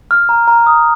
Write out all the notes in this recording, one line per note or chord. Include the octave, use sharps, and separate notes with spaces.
F6
A#5
A#5
D#6